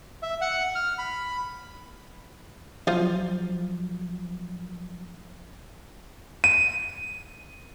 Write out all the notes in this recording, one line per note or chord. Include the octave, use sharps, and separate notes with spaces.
E5
F#5
F6
B5
F3 F#3 F4 C5 F5
D#7